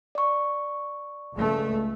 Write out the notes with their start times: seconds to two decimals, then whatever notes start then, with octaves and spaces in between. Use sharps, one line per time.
0.15 D5 C#6
1.33 C#2 A3